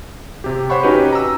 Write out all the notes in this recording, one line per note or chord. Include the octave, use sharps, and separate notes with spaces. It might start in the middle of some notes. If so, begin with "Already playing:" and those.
C3 G4
C5 C#5 F#5 B5 C#6
C#4 D#4 F#4 G4 B4
A#5 E6